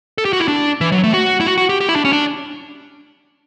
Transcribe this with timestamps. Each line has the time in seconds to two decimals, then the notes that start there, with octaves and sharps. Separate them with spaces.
0.18 A4
0.25 G4
0.33 F#4
0.40 E4
0.48 D4
0.81 E3
0.92 F#3
1.04 A3
1.14 F#4
1.40 E4
1.47 F#4
1.58 F#4
1.69 G4
1.81 G4
1.89 E4
1.96 D4
2.05 C#4
2.13 D4